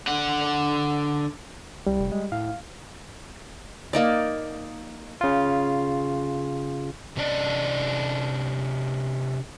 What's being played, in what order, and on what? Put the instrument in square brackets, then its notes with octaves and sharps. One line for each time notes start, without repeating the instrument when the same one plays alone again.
[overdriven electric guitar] D3 F#5
[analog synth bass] C2 [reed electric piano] G3
[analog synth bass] F1
G#3
[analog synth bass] A2 [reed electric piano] F5
[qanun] A#3 D#4 D5
[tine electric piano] C#3 F4
[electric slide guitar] C3 C#4 D4 D5 D#5